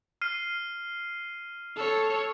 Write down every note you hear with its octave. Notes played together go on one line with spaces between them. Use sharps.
F6 C7 D#7
A4 C#5